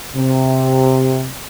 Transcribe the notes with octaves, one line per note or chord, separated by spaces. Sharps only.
C3